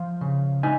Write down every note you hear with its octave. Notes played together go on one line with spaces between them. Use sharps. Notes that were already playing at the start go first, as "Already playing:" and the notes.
Already playing: F3 F5
C#3
D#4 G#5